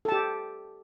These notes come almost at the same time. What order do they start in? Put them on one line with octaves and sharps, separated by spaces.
A4 A5 G4